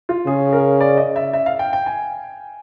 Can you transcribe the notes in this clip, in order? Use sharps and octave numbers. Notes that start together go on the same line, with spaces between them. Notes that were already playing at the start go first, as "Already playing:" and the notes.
F4
C#3 G#4
A#4
D5
D#5
E5
E5
F5
G5
G5
G#5